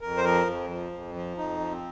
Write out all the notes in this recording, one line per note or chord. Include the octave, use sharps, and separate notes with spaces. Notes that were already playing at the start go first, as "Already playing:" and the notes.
F2 A#4
C5
F3 A#4
F2
F3
F2
F3
F2 D#4
F3
C4